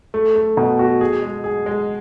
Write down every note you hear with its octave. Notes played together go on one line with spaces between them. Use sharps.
A3
A3
B2
F#4
G#4
G#3
G#4
G#3